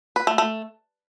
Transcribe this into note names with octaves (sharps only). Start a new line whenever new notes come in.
B4
A3
A3